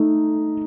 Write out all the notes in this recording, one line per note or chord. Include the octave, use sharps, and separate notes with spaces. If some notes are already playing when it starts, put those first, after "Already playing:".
Already playing: A3 D#4